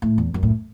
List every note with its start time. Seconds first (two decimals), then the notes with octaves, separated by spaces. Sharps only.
0.02 A2
0.18 E2
0.34 F#2
0.43 A2